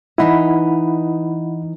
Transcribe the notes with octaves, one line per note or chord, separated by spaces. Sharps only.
E3 D#4 E4 D#5 F#5 B5